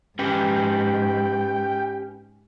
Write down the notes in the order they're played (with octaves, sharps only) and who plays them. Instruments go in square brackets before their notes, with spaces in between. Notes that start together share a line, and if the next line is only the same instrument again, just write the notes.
[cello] G#2 [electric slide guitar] C#4 G4 B4 [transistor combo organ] G5